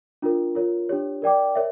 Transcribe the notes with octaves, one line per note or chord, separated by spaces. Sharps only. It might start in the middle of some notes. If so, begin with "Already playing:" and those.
D4 F4 A#4
F4 A#4 C#5
D4 G4 C#5
A#4 D5 G5 D6
A#4 C#5 E5